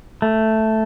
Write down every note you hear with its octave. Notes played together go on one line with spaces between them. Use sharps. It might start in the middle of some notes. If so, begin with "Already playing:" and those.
A3